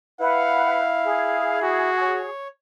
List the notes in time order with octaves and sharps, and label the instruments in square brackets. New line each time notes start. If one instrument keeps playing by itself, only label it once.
[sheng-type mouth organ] E4 [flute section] B4 F#5 [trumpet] F5
[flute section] G#4
[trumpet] F#4
[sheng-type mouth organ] C#5